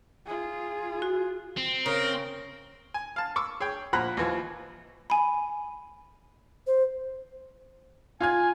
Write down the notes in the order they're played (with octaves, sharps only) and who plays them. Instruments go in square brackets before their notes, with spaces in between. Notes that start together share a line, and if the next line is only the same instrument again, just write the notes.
[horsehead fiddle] F4 G#4
[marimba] F#4
[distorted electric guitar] C4
[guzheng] C#3 [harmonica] A#4
[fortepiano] G#5
F5 A5
C#6 D6 E6
G#4 C#5 G5
A#2 F3 F#5 A#5 B5 F#6
D#2 E3 F3
[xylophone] G#5 B5
[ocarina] C5
[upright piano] F4 F6 G#6 [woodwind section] G#5